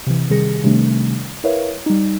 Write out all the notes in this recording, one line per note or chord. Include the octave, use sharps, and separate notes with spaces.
C3 E3
C3 D#3 G3 G#4 A#6 C#7
C3 D#3 G3 A3 D4
E4 A#4 B4 C#5 E5 F5
G3 D#4